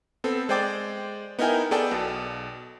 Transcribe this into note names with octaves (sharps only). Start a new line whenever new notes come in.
B3 C4 A4
G#3 C5 D5 G5 D6 A6
B3 D#4 E4 A#4 G5 G#5
B3 G#4 A4 D5 G5 A5
B1 B2